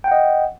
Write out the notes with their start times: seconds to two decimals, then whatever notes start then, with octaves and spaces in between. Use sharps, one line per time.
0.04 G5
0.08 F#5
0.11 D#5